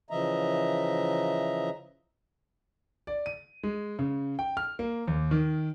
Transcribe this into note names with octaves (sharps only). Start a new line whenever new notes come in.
C#3 E3 F3 D#5 E5 A#5
D5
D#7
G#3
C#3
G5
F6
A#3
D#2
D#3